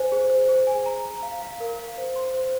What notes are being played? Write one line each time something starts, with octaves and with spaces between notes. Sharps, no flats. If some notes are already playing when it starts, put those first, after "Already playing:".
Already playing: C5 G#5
G#4
C5
G#4
G#5
A#5
A#5
F5
F5
A#4
F5
C5
C6
C5